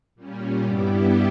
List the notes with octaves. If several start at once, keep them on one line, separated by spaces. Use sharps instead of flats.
A#2 G3 C#4
G2 G3 B3 E4 G4